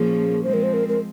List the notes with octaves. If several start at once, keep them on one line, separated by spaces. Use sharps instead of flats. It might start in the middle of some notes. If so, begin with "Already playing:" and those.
Already playing: A#2 F3 A#3 C#4 G#4
F3 G#3 C4 C5
A#4
C5
A#4
A#4